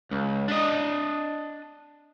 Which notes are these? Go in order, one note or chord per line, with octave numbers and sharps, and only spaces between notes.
C#2
D4 D#5